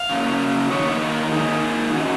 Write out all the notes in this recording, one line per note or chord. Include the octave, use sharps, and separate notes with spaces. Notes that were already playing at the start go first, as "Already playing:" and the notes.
Already playing: F5
C#3 F#3 A#3 C#4
D#3 A#3 D#4 C#5
B4
A#4
A#4
D#3 A#3 D#4 G#4
D#3 F#3 C#4 F#4